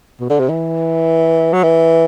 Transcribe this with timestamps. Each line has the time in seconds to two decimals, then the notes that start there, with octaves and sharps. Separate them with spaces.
0.20 B2
0.30 D3
0.39 C3
0.49 E3
1.53 F#3
1.63 E3